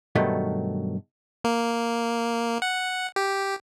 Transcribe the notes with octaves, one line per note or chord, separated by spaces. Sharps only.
G2 B2 D#3 F#3 A3
A#3
F#5
G4